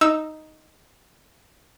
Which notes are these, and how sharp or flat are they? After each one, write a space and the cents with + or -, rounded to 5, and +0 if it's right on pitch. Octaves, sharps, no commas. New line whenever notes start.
D#4 +0 E6 +0